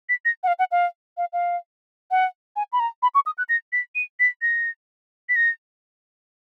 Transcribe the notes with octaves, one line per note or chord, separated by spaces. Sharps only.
B6
A#6
F#5
F5
F#5
F5
F5
F5
F#5
G#5
B5
A#5
B5
C#6
D#6
F#6
A#6
B6
D#7
B6
A#6
B6
A#6